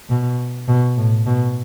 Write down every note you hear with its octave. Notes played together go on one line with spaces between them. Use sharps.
B2
B2
A2
B2